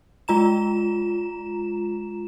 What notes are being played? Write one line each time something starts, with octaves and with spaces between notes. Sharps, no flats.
G#3 F4 A#5 E7